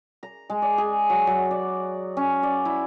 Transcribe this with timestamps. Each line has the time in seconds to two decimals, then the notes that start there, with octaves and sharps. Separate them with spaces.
0.23 A#5
0.50 G#3
0.62 D5
0.78 G#4
1.10 F#3
1.27 F#3
1.51 D5
2.17 C#4
2.43 D5
2.65 E4